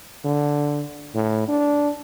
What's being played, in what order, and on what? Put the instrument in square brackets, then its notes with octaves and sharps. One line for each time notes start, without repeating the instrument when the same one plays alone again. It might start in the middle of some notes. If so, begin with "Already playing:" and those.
[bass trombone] D3
A2
D4